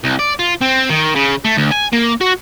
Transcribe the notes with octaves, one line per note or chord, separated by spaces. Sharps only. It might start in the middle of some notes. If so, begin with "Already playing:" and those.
C2
D5
F4
C4
D#3
C#3
A3
D2
G#5
A#3
F#4